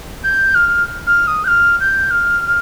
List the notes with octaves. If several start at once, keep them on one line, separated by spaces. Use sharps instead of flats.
G6
F6
F6
D#6
G6
F6
G6
F6